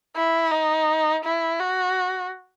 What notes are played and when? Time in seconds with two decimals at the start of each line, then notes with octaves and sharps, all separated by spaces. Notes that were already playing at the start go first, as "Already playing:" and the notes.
0.16 E4
0.52 D#4
1.24 E4
1.60 F#4